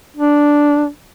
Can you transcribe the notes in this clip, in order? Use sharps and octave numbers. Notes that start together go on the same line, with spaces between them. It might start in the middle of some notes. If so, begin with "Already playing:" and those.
D4